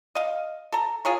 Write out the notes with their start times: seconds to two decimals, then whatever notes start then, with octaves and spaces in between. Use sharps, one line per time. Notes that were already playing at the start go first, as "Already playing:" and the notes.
0.15 D#5 F5
0.72 A4 A#5
1.05 F4 G#4 A#4 C#5